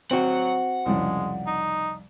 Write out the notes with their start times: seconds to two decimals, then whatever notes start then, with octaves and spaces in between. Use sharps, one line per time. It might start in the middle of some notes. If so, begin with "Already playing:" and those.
0.11 F#3 C4 F#4 F#5
0.86 C2 F2 C#3 G#3
1.47 D#4